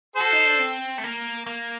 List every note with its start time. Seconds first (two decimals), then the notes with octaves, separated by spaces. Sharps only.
0.16 F#4 A4 C5
0.33 D#4
0.46 D4
0.59 C4
0.98 A3
1.04 A#3
1.46 A#3